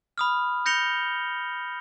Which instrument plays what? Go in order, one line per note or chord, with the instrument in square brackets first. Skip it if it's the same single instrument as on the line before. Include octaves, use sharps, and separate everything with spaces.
[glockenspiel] B5 D#6 F6
G6 A#6 C#7 F7 G7